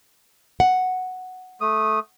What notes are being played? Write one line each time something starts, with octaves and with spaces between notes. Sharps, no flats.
F#5
A3 D#6